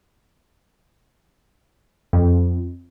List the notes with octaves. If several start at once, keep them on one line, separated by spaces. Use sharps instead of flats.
F2